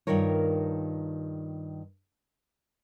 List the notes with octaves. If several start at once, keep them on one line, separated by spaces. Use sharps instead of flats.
G2 B2 D#3 F4 A#4 C#5